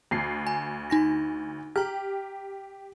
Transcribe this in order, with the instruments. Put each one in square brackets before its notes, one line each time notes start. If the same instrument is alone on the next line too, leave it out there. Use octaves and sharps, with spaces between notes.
[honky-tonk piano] D2 C7
[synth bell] G#5
D#4 G#5 A#6
[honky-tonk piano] G4 [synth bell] A#5 F6